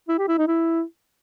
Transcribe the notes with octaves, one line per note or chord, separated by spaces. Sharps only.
E4
G4
E4
D#4
E4